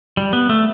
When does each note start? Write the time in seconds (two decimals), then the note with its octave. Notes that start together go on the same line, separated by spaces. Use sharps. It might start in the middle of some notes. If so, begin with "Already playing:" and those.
0.17 G3
0.33 B3
0.49 A3